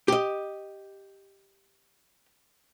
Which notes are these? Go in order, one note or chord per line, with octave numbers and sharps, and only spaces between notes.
G4 D#5